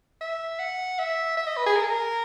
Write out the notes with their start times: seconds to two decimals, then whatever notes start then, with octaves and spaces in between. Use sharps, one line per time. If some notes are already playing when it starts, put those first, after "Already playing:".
0.21 E5
0.60 F#5
0.99 E5
1.37 E5
1.47 D#5
1.57 B4
1.66 G#4
1.76 A#4
1.83 G#4
1.90 A#4